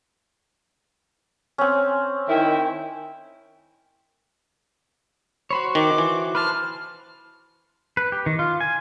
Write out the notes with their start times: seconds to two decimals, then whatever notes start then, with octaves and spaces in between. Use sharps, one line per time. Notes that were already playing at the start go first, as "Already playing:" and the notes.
1.58 C4 C#4
2.29 D#3 E4 G5
5.51 F#4 C5 C#5 B5
5.75 D#3 D6
5.98 E3
6.35 B4 C5 A5 F6
7.97 B4
8.12 G4
8.26 D#3
8.39 F4
8.60 G#5